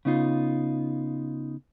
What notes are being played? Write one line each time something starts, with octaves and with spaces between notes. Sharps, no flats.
C#3 B3 D#4 F4